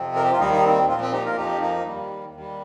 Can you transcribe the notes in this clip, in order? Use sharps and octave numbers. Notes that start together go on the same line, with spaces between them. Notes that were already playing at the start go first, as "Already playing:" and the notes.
Already playing: F2 C3 F3 C4
A#4
G4
F4
D#2 D#3 G3 A#3 D#4
D#4
C4
A#2 F3 C4 F4
C4
D#4 G4
F4 A#4
F2 F3 D#4 G4
A#3 D#4
D#2 D#3 G3
D#2 D#3 G3